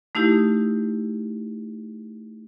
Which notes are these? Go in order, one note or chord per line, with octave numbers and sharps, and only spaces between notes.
A3 D#4 E4 G4